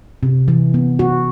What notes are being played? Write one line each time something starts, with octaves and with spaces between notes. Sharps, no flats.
C3
E3
B3
F#4